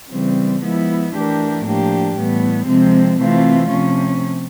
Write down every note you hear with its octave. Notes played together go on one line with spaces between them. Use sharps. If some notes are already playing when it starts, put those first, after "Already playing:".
C#3 E3 G3 C4
F3 G#3 B3 E4
E3 A3 D4 G4 A#4
A2 F3 A#3 D4 G4
A2 E3 G3 B3
C3 F3 G#3 C4
C3 E3 A3 C4 F4
C3 F3 A3 C#4